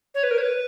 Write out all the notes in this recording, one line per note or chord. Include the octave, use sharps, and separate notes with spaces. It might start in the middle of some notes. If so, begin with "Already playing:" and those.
C#5
B4
A#4
C#5
B4